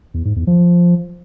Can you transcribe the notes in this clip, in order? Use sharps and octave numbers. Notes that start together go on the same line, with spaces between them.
E2
G#2
E2
F3